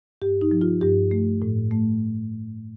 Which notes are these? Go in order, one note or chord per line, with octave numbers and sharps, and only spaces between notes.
G2 G4
D#4
F3
F4
G2 G4
A3
A2
A3